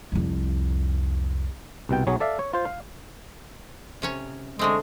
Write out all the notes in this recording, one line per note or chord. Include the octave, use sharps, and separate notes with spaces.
C2 F2
C2 B2 G5
B1 F#3 G#4 C#5
A4 D5 E5 F5
C#5
F4 C5
F5
C3 C#4 C#5
D3 G#3 A3 C4